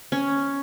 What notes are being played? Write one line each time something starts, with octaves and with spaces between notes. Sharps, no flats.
C#4